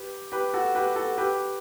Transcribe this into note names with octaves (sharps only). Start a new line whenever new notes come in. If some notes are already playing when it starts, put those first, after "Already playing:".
Already playing: G4 B4
G4 B4
F#4 A4
G4 B4
F#4 A4
G4 B4